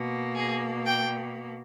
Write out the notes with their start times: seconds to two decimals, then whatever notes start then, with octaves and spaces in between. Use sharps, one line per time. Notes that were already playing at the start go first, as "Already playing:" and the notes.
Already playing: B2 A#3
0.35 G#4
0.86 G5